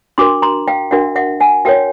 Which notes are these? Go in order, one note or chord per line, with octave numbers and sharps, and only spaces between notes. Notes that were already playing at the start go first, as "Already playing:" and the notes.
D4 F#4 A#4 C6 D6
A#5 C6
F5 G5
D4 F#4 A#4 E5 F#5
E5 F#5
F#5 G#5
F#4 A#4 C#5 F5 G5